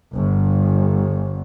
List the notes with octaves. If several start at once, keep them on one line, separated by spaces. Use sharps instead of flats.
G1